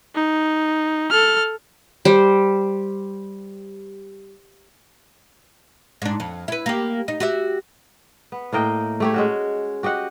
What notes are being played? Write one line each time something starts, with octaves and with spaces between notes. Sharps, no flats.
D#4
A4 F6
G3 C5
G#2 D4
F2
E4 B4
A#3 G4
D#4
F#4 G4 E5
B3
A2 A#3 D#5 G5
A3 G4 C#5
G#3 C#4 F#4
F#4 G4 D#5 F#5